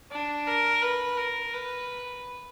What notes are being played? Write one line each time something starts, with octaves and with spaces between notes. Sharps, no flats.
D4
A#4
B4
A#4
B4